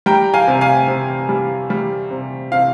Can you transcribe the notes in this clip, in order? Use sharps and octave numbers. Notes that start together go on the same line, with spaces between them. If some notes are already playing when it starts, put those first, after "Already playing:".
G3 G5 A#5
F5 G#5
C3
F5 G#5
C3
G3
G3
C3
C3 F5